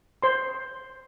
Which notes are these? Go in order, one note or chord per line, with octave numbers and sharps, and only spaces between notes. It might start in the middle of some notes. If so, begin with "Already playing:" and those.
C5 C6